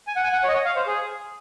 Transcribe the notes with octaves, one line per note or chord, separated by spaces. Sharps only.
G#5
F#5
G#5
F#5
C#5
D#5
C#5
F5
C5
G#4